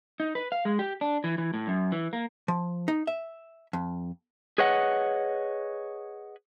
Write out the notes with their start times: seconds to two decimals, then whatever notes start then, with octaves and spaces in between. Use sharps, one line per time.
0.20 D#4
0.35 B4
0.52 F5
0.65 G#3
0.79 G4
1.01 D4
1.24 E3
1.38 E3
1.54 A2
1.67 F#2
1.92 E3
2.13 A#3
2.48 F3
2.88 D#4
3.07 E5
3.73 F2
4.58 G#4 B4 C#5 D#5 F#5